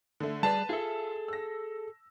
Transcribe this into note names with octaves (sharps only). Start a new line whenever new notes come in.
D3 A3
G3 G#4 B4 D5 A5
F4 G#4 A4 E5
E6 A#6